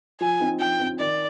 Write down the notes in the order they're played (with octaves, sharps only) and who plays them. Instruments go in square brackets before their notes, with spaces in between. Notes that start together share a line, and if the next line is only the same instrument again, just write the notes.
[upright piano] F3 [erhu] G#5
[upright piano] C4 D#4
[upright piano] F3 [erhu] G5
[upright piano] C4 D#4
[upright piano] D#3 [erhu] D5